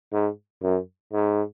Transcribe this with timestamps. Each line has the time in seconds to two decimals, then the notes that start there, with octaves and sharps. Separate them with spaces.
0.13 G#2
0.63 F#2
1.13 G#2